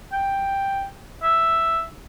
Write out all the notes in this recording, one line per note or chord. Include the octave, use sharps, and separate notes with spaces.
G5
E5